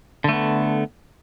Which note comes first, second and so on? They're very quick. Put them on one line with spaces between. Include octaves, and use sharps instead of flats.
D3 A3 B3